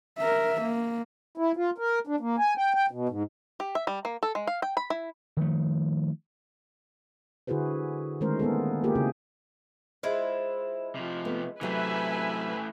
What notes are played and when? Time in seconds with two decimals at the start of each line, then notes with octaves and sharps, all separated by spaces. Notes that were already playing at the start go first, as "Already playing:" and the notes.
0.18 A#4 E5
0.61 A#3
1.38 E4
1.57 F4
1.78 A#4
2.07 D4
2.20 A#3
2.39 G#5
2.57 G5
2.74 G5
2.91 B2
3.09 G#2
3.60 G4
3.75 E5
3.87 G3
4.05 A#3
4.23 A4
4.35 G#3
4.47 F5
4.62 G5
4.77 B5
4.90 E4
5.37 D#3 F3 A3
7.47 D3 E4 F#4 G#4 B4 C5
8.21 D#3 G#3 A3 C#4 A#4 C5
8.39 A#3 B3 G#4 A4
8.84 A#3 F4 G4 G#4 A#4
8.95 C#3 A#3 C4 E4 G#4
10.03 G#3 E4 F4 C5
10.95 C3 F3
11.25 A3 B3
11.61 C3 E3 F#3 A3 G4 B4 E5 G#5